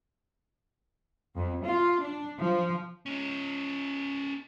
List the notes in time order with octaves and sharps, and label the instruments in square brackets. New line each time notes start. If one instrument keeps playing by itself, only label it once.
[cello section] F2
F4
D4
F3
[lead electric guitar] C#4 D#4